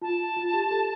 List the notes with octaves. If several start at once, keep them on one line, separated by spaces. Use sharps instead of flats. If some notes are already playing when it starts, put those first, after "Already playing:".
F4 A5
F4
G4
A4